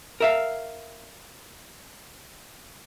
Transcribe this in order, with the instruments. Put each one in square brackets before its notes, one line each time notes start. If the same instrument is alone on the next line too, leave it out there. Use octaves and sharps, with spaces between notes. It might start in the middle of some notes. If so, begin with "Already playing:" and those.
[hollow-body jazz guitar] A#4 E5 F5